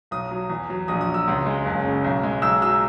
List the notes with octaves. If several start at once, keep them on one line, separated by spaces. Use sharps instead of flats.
B1 D#6
F#3
E2
F#3
A#1 D#6
D#6
F#3
E6
C#2
G#3
F#1
C#3
B1
G#3
B1 E6
F#3 E6